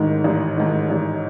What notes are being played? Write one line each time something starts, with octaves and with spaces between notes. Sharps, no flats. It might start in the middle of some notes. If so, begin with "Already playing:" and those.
Already playing: A1 G#2 D#3
A1
G#2 D#3
A1